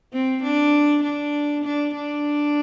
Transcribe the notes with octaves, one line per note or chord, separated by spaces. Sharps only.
C4
D4
D4
D4
D4